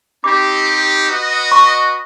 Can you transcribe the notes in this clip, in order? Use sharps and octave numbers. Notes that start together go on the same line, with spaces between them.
C4 D#4 G4 D6
F#4 B4 D#5
C#6